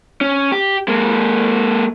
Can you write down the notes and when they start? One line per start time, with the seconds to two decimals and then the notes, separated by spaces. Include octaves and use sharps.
0.21 C#4
0.52 G4
0.88 G#3 A#3